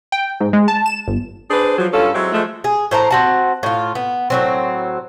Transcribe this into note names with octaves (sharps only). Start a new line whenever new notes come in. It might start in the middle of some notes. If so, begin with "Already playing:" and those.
G5
G#2
G#3
A5
E7
G1
D4 G#4 B4 C5
F3 F#3
G2 C#4 F4 A4
F#3 G#3 C4 E4
F3 G#3 A3
G#4
A2 C5 A5 A#5
C4 F#4 A5
A2 F4
B3
A2 F#3 C4